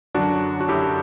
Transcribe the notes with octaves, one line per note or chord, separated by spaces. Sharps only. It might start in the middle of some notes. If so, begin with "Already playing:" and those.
F#2 D3 F#3 D4 F#4
F#4
F#2 D3 F#3 E4 G4